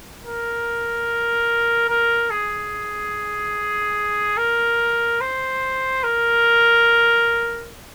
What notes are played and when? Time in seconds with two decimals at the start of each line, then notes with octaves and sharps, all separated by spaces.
0.23 A#4
1.89 A#4
2.30 G#4
4.37 A#4
5.21 C5
6.03 A#4